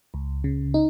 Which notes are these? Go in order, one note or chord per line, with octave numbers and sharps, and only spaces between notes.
C#2
C#3
D#4